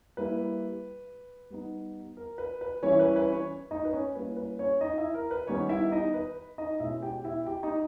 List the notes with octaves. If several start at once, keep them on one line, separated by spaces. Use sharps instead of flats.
G3 A#3 E4 B4
G3 B3 D#4
A#4
B4
B4
E3 G3 C#4 E4 C#5
B4
B4
C#4 C#5
D#4 D#5
B4
C#4 C#5
G3 A#3 C#4 E4 B4
B4
C#4 C#5
D#4 D#5
E4 E5
A#4
B4
D#3 G3 B3 C#4 D#4 C#5
E4 E5
D#4 D#5
B4
D#4 D#5
B2 G#3 C#4 E4 E5
G4 G5
E4 E5
G4 G5
D#4 D#5